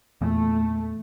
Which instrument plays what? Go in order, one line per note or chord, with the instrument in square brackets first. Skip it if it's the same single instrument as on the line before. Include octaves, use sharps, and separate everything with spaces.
[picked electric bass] E2 A#2 [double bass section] A3